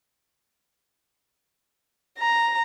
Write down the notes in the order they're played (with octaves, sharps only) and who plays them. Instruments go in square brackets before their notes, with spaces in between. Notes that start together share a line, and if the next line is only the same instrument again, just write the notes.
[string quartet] A#5